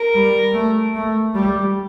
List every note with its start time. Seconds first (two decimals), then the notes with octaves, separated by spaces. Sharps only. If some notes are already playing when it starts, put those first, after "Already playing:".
Already playing: A#4
0.15 G3
0.54 A3
0.95 A3
1.35 G3 G4